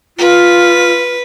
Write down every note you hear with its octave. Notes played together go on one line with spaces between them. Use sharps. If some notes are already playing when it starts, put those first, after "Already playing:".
F4 B4